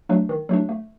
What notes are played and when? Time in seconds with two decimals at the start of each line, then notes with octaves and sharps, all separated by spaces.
0.09 F#3 A3 D4
0.29 D#3
0.49 F#3 A3 D4
0.69 A3